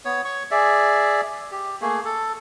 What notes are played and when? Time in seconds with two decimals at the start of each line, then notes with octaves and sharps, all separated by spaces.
0.05 B3 C#5
0.25 C#5 C#6
0.51 G#4 D5 E5
1.51 G4
1.81 A3 A#3 G#4
2.05 A4